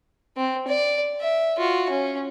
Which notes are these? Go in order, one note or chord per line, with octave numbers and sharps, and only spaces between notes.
C4
D5
E5
F4 F#4
C#4